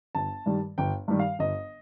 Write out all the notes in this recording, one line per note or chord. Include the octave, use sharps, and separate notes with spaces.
G1 A5
G2 D#3 G3
G1 G5
G2 D#3 G3
F5
G1 D#5